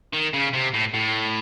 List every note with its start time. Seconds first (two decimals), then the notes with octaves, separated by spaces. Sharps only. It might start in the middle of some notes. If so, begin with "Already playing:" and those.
0.13 D#3
0.33 C#3
0.53 C3
0.74 A2
0.94 A2